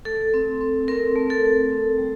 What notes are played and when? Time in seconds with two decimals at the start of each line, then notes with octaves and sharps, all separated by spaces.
0.05 A3 A4
0.34 C4
0.61 C4
0.88 C4 A#4
1.16 A3
1.30 A4
1.44 A3
1.72 C4
1.98 G3